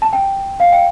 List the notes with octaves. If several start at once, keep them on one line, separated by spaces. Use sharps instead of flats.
A5
G5
F5
G5